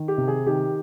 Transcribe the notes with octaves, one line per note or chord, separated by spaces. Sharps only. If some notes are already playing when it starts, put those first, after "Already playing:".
Already playing: D#3
G4
C3
G#4
D#3 G4